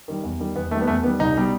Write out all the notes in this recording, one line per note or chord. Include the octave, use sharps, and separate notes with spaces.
D#3 G3
E2
D#3 G3
E2 B3
D#3 G3 A3
B3
E2 A3
D#3 G3 B3
C2 D#4
B2 G3